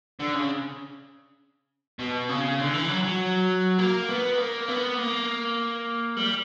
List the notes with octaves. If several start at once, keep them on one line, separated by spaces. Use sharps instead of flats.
D3
C#3
B2
C#3
D3
E3
F#3
F#3
A#3
B3
A#3
B3
A#3
G3